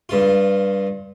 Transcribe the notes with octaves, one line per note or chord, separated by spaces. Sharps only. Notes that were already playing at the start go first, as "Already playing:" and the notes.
G2 F4